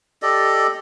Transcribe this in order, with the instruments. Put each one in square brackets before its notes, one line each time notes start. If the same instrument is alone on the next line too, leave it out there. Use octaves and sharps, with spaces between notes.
[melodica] G4 A4 D5 D#5